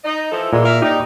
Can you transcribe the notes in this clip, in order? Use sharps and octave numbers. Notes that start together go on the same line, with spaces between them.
D#4 D#5
E3 F3 A4
A#2 D3 E3 G#3
A#4 E5 F5
D#4 G4 D5 D#5